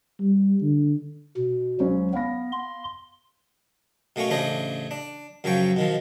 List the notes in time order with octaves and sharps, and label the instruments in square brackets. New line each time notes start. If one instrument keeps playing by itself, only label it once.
[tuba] G3
D3
[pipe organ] B2
[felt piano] C#2 C#4 C5 [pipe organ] F#3
[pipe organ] B3 [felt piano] F5 B5 A#6
[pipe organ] C6
[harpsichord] B2 A3 A#3 C#4 C#6
A1 C#3 A3 D4 C5 D#5
D4
F#2 C#3 F3 F#3 G5 C#6
B2 D#3 F3